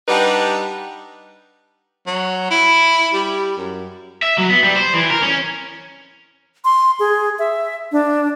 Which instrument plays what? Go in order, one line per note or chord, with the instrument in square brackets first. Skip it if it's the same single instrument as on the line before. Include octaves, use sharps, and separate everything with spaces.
[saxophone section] G3 D4 D#4 G4 B4 F#5
[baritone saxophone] F#3
E4
G3
F#2
[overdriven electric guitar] E5
F#3
B3
G3
C5
E3
A#4
C#4
[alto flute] C6
G#4
E5
D4